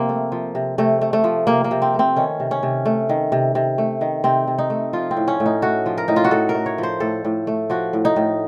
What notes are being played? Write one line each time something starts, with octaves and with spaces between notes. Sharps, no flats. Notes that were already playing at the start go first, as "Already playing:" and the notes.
Already playing: C3 F3 A#3 C4
A3
F3
C3
C3 A3
A3
A3
F3
C3 A#3
A#3
C3
C4
A3
C4
D#3 C#4
C3
C#4
C3
A3
D#3
C3
C3
A3
D#3
C3 C4
C3
D#4
A3
F3 F4
C4
A2
C#4
A2
D#4
A3 F#4
F3
A#4
A2 D#4
F4
F#4
A2 A4
A#4
A3
C#5
F3
C5
A2 A4
A2
A3
F3 F#4
A2
D#4
A2